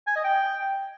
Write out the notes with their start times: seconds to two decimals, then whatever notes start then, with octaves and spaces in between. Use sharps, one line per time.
0.07 G#5
0.16 D#5
0.24 G5